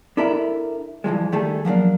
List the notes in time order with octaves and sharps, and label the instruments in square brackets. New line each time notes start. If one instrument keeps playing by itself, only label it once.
[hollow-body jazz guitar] D4 E4 A4 A#4 E5 B5
G2 E3 F3 G#3
D#3 G3 A3 G#4 A4
F3 F#3 A#3 D4